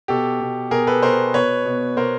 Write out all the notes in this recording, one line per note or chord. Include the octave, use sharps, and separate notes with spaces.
B2 G4 A4
B2
B2 G#4 A#4
A4 B4
B2 A#4 C5
B2 B4 C#5
B2
B2 A#4 C5